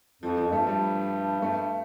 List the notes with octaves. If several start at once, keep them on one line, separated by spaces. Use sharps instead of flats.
F2 F3
F3
F2
G2 A3
G3
G2 A3